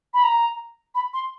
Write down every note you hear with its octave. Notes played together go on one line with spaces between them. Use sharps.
B5
A#5
B5
C6